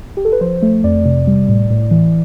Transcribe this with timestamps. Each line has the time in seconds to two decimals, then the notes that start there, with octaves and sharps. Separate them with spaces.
0.17 G4
0.25 A4
0.32 B4
0.41 F3 C5
0.62 A3
0.84 F2 D5
1.05 C3
1.27 G3
1.49 A2
1.70 A2
1.91 E3